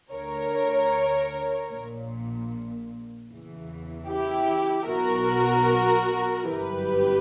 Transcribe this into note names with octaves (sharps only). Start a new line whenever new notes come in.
D2 D3 A#4 C#5
A#1 A#2
E2 C#3 E3
E4 G4
B1 B2 F#4 A#4
G1 F#2 E3 G4 B4